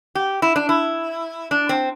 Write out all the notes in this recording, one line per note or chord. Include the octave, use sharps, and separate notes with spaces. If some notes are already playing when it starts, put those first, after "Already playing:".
G4
E4
D4
E4
D4
C4